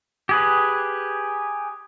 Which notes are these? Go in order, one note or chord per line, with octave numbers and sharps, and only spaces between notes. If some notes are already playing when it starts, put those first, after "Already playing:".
G4 G#4 B4